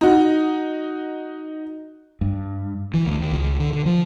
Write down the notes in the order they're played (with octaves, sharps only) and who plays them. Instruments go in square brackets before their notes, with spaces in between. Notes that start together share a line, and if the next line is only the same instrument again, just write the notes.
[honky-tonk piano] D#4 F#4
[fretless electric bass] G2
[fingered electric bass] E3
D2
D#2
C#2
D3
D3
F3